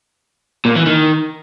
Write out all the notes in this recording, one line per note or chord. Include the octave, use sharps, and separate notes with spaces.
A#2
E3
D#3